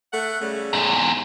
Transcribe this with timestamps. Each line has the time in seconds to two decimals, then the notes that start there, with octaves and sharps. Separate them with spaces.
0.13 A3 F#5
0.41 C#3 G3 A3
0.73 E2 G#2